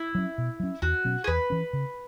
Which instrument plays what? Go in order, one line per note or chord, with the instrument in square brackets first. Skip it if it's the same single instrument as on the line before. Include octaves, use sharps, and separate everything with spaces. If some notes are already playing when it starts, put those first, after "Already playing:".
Already playing: [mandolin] E4
[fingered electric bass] F#3 C#4
B2
F#3 C#4
[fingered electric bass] E2 [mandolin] F#4
[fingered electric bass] B2 F#3 C#4
[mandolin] G#4
[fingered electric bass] E2 [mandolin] B4
[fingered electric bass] E3 C#4
C#3